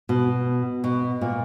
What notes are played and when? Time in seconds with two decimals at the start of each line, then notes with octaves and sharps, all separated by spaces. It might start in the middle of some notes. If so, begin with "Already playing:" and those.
0.09 B2
0.84 B2
1.21 A#2